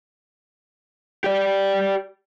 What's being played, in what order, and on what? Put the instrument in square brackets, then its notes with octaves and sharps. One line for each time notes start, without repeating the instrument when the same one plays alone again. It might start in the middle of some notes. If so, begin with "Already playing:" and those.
[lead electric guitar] G4 D5